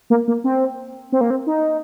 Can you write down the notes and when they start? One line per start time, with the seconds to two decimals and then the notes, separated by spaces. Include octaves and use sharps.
0.10 A#3
0.28 A#3
0.44 C4
1.12 C4
1.21 A#3
1.30 C4
1.47 D#4